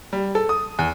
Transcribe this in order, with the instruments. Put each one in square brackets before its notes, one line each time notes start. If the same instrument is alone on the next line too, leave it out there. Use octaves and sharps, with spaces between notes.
[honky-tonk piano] G3
A4
D#6
E2